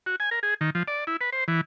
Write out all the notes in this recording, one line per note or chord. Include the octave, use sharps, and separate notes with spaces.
F#4
G#5
A#4
G#4
D#3
F3
D5
E4
B4
C5
E3